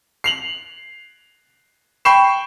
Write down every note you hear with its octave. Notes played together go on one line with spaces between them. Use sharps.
C7 F7 F#7
G5 B5 C#6 C7 E7